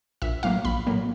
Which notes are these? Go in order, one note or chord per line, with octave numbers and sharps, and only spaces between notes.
A#1 E5
A2 F#3 A#3 F5
A#1 B5
A2 F#3 A#3